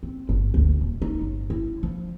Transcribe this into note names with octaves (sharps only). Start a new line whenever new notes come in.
C4
G1
D2
D#1
D#4
G1
E4
F3